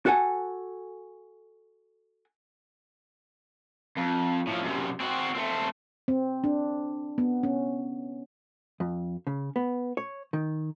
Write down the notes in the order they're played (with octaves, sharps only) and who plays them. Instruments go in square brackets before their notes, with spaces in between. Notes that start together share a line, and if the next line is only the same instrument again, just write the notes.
[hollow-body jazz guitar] F#4 A4 F#5 G#5
[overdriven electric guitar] F2
A2 F3
F#2 C3
C4 F#4
A3 C4
[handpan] C4
D4
B3
C#4
[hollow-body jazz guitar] F2
C#3
B3
C#5
D#3